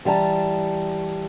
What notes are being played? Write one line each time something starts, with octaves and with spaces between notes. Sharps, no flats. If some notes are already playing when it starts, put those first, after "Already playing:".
E3 G3 G5 A5 A#5